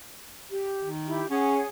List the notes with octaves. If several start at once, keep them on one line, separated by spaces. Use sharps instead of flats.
G4
D#3
E4 G4
C#4 G#4 C#5 F#5